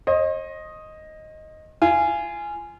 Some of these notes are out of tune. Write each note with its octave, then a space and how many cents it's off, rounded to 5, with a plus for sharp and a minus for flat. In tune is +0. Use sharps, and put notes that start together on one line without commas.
C5 +45 D#5 +0
F4 -25 G#5 +0